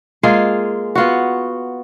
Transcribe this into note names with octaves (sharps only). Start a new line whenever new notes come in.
G#3 A#3 F4 G#4
B3 F4 F#4